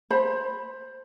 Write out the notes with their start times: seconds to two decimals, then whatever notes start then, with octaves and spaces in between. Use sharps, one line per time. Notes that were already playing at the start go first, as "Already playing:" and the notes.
0.11 C5 B5